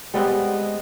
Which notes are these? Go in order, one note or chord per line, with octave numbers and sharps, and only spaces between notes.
G3 G#3 B3 C4